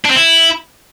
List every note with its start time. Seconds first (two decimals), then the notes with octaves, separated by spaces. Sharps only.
0.05 D4
0.10 C4
0.16 E4